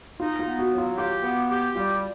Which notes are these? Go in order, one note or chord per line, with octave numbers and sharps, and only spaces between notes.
D#4 F4
F4
B3
F#4
F#3
F4
F4 G4
B3
G4
G3 F4